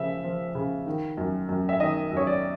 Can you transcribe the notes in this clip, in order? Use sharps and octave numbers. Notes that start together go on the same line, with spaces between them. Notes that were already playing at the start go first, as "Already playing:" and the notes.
Already playing: C#3 F3 E5
F3
C#3
D#3
F#2
F#2
E5
D#3 D#5
F#2
C#5
D5